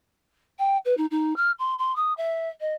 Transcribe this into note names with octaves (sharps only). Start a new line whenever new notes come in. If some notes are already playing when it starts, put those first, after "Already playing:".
G5
B4
D#4
D#4
F6
C6
C6
D#6
E5
D#5